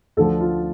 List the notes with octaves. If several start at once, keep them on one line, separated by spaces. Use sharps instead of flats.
D2 D3 F3 A4
F4